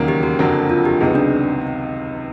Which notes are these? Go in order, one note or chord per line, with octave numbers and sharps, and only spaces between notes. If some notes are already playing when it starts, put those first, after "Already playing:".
Already playing: E1 D#2 C#3 F#3 A#3
G4
F#4
F#1 F2 D3 F#3 A#3
F4
G4
C#2 C3 D#3 F#3 B3 G#4
D4